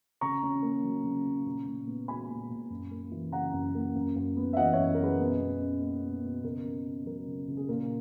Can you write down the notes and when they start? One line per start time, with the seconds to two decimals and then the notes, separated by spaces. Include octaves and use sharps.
0.21 C#3 A#5 C#6
0.43 C#4
0.62 A#3
0.83 F#3
1.04 C#3
1.25 C#4
1.46 A#2
1.66 A#2
1.87 B3
2.08 G#3 G#5 B5
2.29 A#2
2.49 A#2
2.70 F#2
2.91 A#3
3.11 E3
3.32 C#3 F#5 A#5
3.53 F#2
3.75 A#3
3.95 F#2
4.16 F#2
4.37 B3
4.53 E5
4.57 E3 D#5 F#5
4.73 C#5 E5
4.78 F#2
4.94 A#4
4.99 F#2 G#4 B4
5.20 B2
5.40 B2
5.61 C#4
5.81 A#3
6.02 B2
6.24 B2
6.43 C#3 A#4
6.65 C#3
6.86 C#4
7.06 F#3 A#4
7.27 C#3
7.48 C#3
7.57 G#4
7.68 A#2 A#4